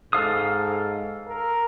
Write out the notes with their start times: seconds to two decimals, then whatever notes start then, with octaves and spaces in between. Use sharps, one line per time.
0.13 G#2 A4 F5 D#6
1.28 A#4